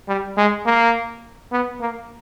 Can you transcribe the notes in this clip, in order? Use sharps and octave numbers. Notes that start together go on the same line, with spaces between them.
G3
G#3
A#3
B3
A#3